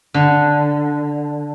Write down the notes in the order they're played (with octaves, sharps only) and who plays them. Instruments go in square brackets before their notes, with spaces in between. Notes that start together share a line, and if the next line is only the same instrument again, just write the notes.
[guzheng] D3